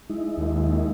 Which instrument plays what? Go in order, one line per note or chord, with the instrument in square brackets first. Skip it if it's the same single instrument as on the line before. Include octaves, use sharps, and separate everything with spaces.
[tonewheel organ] G#3 D#4 E4
[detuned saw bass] D#2